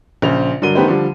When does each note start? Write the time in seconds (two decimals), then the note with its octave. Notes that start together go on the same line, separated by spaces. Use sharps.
0.22 A#1 C#3 C5 F7
0.62 G2 D3 F#3 A#4 D#7 G7
0.75 D#3 A3 B3 G4 B4 C5
0.88 D3 F3 G3